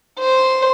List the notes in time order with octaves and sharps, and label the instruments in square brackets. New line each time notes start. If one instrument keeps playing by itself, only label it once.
[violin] C5